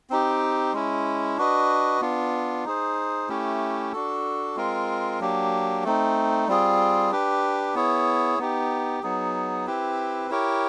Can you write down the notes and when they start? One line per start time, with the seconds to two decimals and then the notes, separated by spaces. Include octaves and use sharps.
0.10 C4 D#4 G4
0.73 G#3 C#4 E4
1.37 D4 F#4 B4 D#5
2.01 B3 D4 F4
2.65 D#4 G#4 C5
3.28 A3 C#4 E4 G4
3.93 D4 F#4 A4
4.56 G#3 C4 F4 A#4
5.20 F#3 A#3 D4 G4
5.84 A3 C4 D#4
6.48 G3 C4 F4 G#4
7.11 D4 G4 B4
7.75 B3 E4 G#4 C#5
8.39 B3 D#4 G4
9.03 F#3 B3 D#4 G#4
9.67 C4 E4 G4 B4
10.30 E4 G4 A#4 C#5